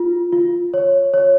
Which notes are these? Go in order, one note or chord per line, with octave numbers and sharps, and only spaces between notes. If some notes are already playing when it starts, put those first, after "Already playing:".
Already playing: F4
F4
C#5
C#5